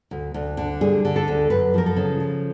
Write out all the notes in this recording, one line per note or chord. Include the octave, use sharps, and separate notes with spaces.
D2
D2
D3
G3 G#4
D3
A4
D2
F#2 B4
F3 A#4
A4
C#3
F3